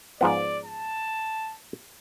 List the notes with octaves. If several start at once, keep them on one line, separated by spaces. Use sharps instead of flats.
G#2 F3 B3 D5
A5